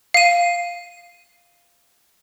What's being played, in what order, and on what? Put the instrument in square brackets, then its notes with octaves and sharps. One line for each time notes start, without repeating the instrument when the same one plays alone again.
[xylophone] F5 D#7